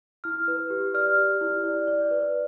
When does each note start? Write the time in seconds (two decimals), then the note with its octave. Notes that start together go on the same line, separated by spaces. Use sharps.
0.24 E4 F6
0.48 B4
0.70 G4
0.94 D5 F6
1.18 G4
1.41 E4
1.64 D5
1.87 D5
2.11 B4